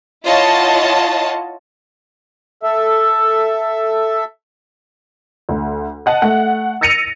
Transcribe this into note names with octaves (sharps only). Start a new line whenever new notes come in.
E4 F4 C#5 D#5 F#5 A5
A4 E5
D2
D#5 F#5 A5
A3 F#5
E6 A6 A#6 C#7 D#7 F7